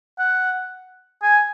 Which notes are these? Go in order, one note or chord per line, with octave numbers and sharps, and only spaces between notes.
F#5
G#5